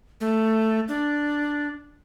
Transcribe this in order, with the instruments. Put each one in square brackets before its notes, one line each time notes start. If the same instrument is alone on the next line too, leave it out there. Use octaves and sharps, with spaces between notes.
[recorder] A3
D4